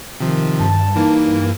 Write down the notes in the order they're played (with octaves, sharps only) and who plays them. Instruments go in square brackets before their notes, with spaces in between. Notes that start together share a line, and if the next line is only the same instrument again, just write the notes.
[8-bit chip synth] C3 F3 [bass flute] D#3
[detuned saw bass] G2 [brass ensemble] A5
[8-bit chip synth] E3 A#3 [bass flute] D#4